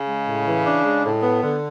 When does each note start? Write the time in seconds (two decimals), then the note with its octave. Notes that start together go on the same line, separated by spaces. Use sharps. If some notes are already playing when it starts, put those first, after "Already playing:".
Already playing: C#3
0.09 G#3
0.27 A2
0.47 E3
0.66 D4
0.85 G#3
1.04 A2
1.23 B3
1.42 D3